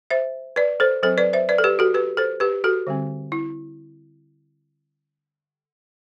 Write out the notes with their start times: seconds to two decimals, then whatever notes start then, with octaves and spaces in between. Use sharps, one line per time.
0.10 C5 E5
0.56 B4 D5
0.80 A4 C5
1.03 F#3 C4 A4 C5
1.18 B4 D5
1.33 C5 E5
1.49 B4 D5
1.58 A4
1.64 G4 B4
1.79 F#4 A4
1.94 G4 B4
2.17 A4 C5
2.40 G4 B4
2.64 F#4 A4
2.87 D3 G3 C4
3.32 E4